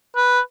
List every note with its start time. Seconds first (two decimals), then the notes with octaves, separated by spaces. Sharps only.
0.16 B4